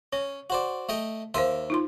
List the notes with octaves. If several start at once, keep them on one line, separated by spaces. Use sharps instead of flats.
C#4 C#5
F#4 C5 D5
A3 D#5 G5
D#2 A#4 C5 E5 F5 C6
D#4 F4 C6